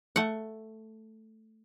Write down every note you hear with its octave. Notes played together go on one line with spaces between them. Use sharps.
A3 F#5